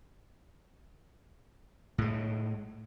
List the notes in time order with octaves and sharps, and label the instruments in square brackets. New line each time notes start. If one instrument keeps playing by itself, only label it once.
[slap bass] A2 G#3